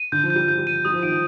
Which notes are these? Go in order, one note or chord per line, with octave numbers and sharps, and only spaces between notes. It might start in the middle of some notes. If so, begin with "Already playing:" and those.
Already playing: D#7
D3 G6
F3
G6
G3
F3 G6
G3
D#7
G3 D#6
F3
D#3 D7
F3